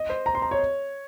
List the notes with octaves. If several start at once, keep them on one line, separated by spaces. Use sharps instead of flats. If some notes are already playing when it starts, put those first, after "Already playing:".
Already playing: D#5
C5
A#5
C6
A#5
C#5